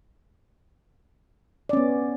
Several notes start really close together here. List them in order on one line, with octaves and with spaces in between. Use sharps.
D5 C#4 B3